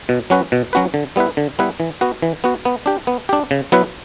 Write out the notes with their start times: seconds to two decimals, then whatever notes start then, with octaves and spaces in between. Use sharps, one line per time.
0.09 B2
0.30 F#3 C#4 F#4 B4
0.52 B2
0.73 F#3 C#4 F#4 B4
0.94 D3
1.16 G3 B3 E4 B4
1.37 D3
1.59 G3 B3 E4 B4
1.80 E3
2.01 B3 F#4
2.22 E3
2.44 B3 F#4
2.65 B3
2.86 D4 G4
3.07 B3
3.29 D4 G4
3.51 C#3
3.72 F#3 B3 E4 B4